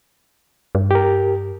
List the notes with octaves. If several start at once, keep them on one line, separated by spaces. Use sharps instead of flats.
G2
G4 A#4